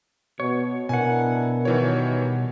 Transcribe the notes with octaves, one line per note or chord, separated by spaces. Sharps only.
B2 C#5
B2 D4 E4 A#4 F#5 G#5
D#3 E3 G3 D#4 F#4 C#5